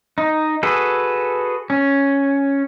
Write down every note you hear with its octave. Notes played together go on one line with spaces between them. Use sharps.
D#4
F#4 G#4 A4 B4
C#4